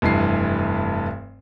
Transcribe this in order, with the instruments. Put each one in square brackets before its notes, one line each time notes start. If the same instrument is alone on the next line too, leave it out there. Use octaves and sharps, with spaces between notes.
[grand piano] F1 G2 E3 C7